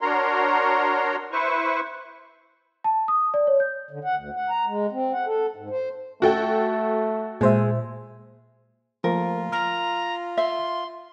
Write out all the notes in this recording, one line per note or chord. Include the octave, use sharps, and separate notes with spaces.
D4 F#4 A#4 C#5 A#5 C6
E4 B4 C5 C#6
A5
D#6
D5
C#5
G6
D3
F#5
D2
F#5
A#5
G#3
C4
F#5
A4
G#2
C5
A3 F#4 A4 G5
A#2 G#3 C5 E5
F3 A3 A#3 F4 A#4
A#5 F6
E5 C6